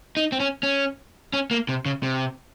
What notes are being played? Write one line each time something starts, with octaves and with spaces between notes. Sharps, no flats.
D#4
C4
C#4
C#4
C#4
A#3
C3
C#3
C3